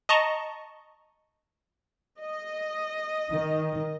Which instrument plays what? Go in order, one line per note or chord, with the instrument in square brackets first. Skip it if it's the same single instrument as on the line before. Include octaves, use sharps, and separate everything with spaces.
[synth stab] D#5 A5 A#5 C#6
[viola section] D#5
[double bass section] D#3